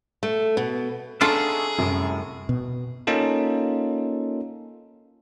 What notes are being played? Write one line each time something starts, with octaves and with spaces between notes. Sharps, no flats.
A3
B2
D4 D#4 F4 F#4 G#4 A4 E5
C2 F#2 A2
B2
A#3 C#4 D#4 F4 A4